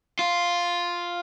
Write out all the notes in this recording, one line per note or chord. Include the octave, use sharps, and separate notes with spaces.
F4